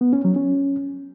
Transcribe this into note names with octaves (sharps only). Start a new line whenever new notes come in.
B3
C#4
F#3
C#4